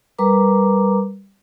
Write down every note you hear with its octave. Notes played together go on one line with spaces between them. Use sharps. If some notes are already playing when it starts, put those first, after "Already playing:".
G3 A#4 B4 A#5 D6